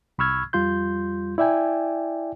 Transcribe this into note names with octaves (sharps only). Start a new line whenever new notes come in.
C2 B5 C#6 E6 F6 G#6
F2 G3 F4 C6 G6
E4 D5 E5 G5 G#5